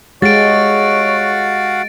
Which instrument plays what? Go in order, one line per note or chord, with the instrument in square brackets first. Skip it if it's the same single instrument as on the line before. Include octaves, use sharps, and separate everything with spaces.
[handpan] G#3 G4 [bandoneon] F#4 F5 F#5 [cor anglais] C#5 [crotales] A6 D7